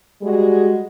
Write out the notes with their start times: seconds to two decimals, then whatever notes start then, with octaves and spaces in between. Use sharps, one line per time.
0.22 G3 G#3 F#4 G#4